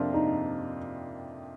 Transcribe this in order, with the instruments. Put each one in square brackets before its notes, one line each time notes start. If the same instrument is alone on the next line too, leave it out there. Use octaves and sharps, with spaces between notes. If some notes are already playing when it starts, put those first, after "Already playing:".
Already playing: [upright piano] F2 C3 F3 A#3 F4 [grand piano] D4
[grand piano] D#4